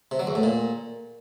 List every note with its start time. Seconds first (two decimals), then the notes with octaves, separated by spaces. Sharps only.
0.11 C3
0.19 F#3
0.27 E2
0.35 A2
0.43 A#2